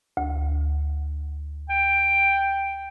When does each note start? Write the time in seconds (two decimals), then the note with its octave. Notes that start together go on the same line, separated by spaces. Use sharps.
0.17 D2
1.70 G5